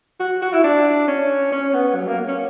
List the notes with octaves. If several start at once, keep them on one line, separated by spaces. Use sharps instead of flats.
F#4
F#4
E4
D4
C#4
C#4
B3
F#3
A#3
C#4